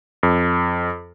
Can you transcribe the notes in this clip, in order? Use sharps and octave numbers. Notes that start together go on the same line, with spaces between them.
F2